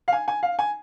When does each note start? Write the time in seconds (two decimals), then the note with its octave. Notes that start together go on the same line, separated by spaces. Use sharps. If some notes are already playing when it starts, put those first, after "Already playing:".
0.08 F5
0.13 G#5
0.28 G#5
0.43 F5
0.59 G#5